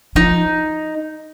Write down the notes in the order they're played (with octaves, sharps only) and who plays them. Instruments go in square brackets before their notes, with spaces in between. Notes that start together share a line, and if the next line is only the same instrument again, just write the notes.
[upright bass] F3 [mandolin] D#4